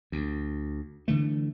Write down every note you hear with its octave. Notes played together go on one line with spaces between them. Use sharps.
D2
D3 E3 A3